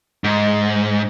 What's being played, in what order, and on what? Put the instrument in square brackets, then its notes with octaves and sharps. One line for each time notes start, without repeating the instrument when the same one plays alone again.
[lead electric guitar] G#2